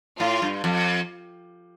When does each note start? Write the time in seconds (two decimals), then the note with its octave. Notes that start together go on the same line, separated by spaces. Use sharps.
0.19 A2 F4
0.42 G2
0.64 F2